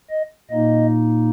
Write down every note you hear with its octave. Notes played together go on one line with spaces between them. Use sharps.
D#5
A#2 A#3 D#4 D#5